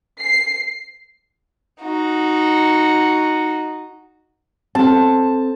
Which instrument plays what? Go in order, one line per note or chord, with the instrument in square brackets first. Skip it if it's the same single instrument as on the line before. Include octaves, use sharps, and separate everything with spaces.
[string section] C7
[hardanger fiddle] D#4 F#4
[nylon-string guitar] C4 A4 [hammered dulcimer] A5